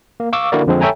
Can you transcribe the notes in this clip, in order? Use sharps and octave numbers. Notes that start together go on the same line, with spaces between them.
A#3
F5 C#6 D6 E6
D3 A#3 E4 F#4 A#4 D5
F2 D3 F3 G#3 C4
A4 C#5 E5 G5 G#5 A#5